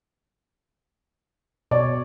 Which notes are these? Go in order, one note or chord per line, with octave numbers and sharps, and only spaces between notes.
B2 C#5 D5